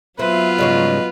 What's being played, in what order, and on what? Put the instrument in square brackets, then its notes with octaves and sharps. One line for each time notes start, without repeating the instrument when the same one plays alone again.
[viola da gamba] F#3 B3 F4 [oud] C4 [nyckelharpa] B4 [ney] E5
[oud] G#2 C#3 G3 [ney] D#5